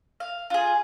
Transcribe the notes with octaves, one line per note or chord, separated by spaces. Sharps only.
F5
F4 G#4